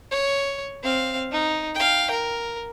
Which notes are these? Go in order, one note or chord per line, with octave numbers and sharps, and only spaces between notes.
C#5
C4 F5
D#4
F5 G5
A#4